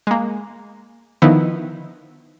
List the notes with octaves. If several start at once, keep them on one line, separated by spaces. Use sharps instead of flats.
G#3 A#3
D3 D#3 F3 B3 D#4 E4